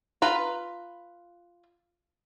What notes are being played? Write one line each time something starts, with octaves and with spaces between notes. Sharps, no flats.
F4 B4 A#5